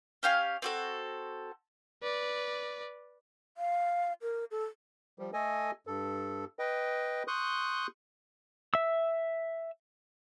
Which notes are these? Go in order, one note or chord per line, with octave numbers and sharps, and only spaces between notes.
C#4 G4 F5 G#5
C4 F#4 A4
B4 D5
F5
A#4
A4
F3 G3
A3 A4 D#5 G#5
G2 A4
B4 D#5 G5
C6 C#6 D#6 F#6 G6
E5 E6